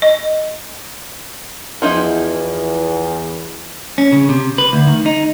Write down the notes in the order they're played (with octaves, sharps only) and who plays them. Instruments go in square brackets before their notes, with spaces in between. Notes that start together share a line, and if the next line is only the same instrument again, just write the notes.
[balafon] D#5
[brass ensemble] E2 [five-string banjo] F3 D#4 E4
[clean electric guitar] C#4
C#3
C3
B4
D2
D#3
D#4